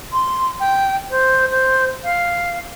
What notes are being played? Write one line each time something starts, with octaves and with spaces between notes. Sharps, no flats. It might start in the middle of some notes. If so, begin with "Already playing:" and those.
C6
G5
C5
C5
F5